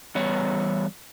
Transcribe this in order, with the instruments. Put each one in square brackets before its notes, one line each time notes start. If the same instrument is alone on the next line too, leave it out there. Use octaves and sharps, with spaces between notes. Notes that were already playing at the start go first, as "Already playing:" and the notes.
[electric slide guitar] E2 G3 B3 C#5